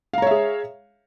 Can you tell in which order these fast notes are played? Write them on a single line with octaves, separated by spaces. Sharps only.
F5 A#5 C#5 E5 G#4